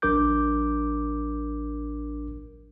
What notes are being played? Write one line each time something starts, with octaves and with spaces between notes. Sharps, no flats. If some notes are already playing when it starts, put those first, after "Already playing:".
A1 F#3 D4 A#4 D6 G6